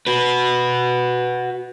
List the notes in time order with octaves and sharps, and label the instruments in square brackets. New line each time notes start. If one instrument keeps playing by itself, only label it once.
[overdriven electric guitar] F#4 B4